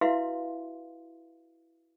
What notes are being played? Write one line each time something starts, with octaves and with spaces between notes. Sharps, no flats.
E4 F#4 B4 E5 F5 C6